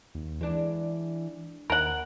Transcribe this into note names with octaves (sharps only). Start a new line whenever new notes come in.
D#2
E3 G#3 D4
D#2 A#4 F#5